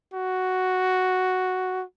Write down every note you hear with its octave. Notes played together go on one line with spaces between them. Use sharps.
F#4